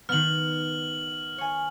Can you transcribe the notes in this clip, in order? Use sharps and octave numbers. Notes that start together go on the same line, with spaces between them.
D#3 B3 F6 F#7
C#5 G#5